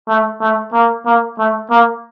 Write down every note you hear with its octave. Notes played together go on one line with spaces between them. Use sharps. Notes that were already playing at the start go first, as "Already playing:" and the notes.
A3
A3
A#3
A#3
A3
A#3